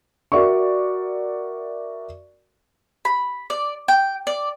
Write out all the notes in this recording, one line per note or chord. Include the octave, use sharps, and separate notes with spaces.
F#4 A#4 D5 E5 C#6
B5
D5
G5
D5